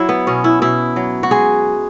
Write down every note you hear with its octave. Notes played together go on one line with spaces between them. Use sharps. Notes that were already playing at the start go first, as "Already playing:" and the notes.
Already playing: F#3 E4
B3
B2 C#4
E4
B2 E4
F#3
F#4
G#3 G#4